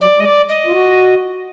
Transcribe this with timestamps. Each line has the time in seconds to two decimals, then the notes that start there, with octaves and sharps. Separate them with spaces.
0.01 F#3 D5
0.19 G#3 D#5
0.25 D5
0.49 D#5
0.66 F4
0.72 F#4